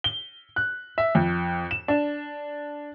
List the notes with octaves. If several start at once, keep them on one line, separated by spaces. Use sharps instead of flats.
G7
F#6
E5
F2
E7
D4